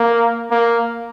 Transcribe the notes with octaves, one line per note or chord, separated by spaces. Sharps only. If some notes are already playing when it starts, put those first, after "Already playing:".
Already playing: A#3
A#3